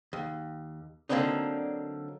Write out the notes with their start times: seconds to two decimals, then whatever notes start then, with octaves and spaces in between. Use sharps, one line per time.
0.13 D#2
1.09 D3 F#3 A#3 C4 D4 D#4